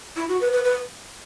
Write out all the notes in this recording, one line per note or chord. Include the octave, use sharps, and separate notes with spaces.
E4
F#4
B4
B4
B4